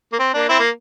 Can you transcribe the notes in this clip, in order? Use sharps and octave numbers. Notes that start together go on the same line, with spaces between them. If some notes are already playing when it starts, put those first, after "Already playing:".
A#3
C4
A#3 D4
C4 E4
A#3